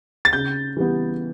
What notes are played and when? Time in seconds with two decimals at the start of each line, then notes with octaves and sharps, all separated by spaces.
0.25 A6
0.33 C#3 G6
0.76 E3 G3 B3